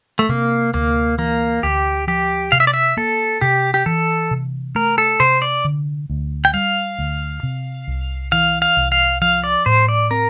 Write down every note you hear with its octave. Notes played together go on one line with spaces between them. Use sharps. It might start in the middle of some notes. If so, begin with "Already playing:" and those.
A3
C3 A#3
D2 A#3
E3 A#3
D2 G4
F3 G4
C3 F5
E5
D5
E5
A#3 A4
C3 G4
G4
E3 A4
C3
A3 A#4
A4
C3 C5
D5
D3
D2
G5
G3 F5
D2
C3
C2
E3 F5
F5
C2
F5
F3 F5
D5
A2 C5
D5
C4 A#4